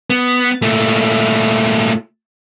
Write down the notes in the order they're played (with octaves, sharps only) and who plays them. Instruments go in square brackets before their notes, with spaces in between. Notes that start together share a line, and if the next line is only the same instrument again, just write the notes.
[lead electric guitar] B3
A#2 A3